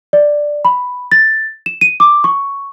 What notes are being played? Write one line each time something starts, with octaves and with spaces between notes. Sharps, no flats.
D5
B5
A6
E7
D#7
D6
C#6